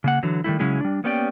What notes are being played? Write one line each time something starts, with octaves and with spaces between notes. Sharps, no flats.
C#3 A#3 F#5
D3 E3 F#3
D#3 G3 A3 E4
C#3 F#3 G#3 C#4 E4 G#4
G3 D4
A#3 B3 C#4 G4 D5 G5